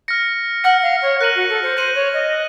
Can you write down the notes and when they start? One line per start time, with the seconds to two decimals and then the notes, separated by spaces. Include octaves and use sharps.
0.08 F6 A#6 C#7
0.64 F#5 F6 A#6 C#7
0.82 F5
1.02 C#5
1.20 A#4 F#6 A#6 D#7 F#7
1.35 F#4
1.49 A4
1.63 C5
1.77 C5 F#6 A#6 D#7 F#7
1.95 C#5
2.13 D#5
2.33 F#6